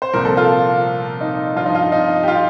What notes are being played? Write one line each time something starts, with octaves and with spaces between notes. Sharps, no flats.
C5
C2 A#2 F3 A#4
A4
F4
D#4
G2 F3 F4
D#4
F4
D#4
G4
F4